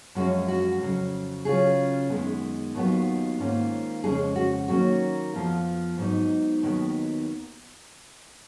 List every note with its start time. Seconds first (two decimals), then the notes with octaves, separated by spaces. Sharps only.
0.15 F#2 F3 G#3 C#4 F#4
0.48 F#4
0.80 F2 C#3 F#3
1.45 C#3 F#3 C#4 F4 G#4
2.10 F#2 D#3 G#3 B3
2.75 D#2 D#3 F#3 B3 F4
3.40 G#2 D#3 A#3 C#4 F4
4.03 F2 C#3 G#3 C#4 G#4
4.36 F#4
4.68 D#3 F#3 A#3 C#4 F#4
5.33 F2 F3 B3 F4
5.98 G#2 F#3 B3 D#4
6.63 D#2 D#3 F#3 B3